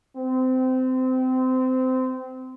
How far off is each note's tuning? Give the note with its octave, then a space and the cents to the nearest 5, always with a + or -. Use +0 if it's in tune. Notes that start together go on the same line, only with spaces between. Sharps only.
C4 -25